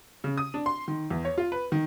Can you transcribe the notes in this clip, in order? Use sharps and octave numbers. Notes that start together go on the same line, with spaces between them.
C#3
D#6
D4
C6
D#3
E2
C#5
F4
B4
D#3